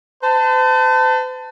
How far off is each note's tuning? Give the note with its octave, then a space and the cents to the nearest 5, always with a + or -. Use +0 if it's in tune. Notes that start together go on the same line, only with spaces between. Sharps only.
C5 -45 A5 +15